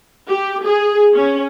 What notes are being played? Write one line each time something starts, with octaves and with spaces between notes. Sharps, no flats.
G4
G#4
C#4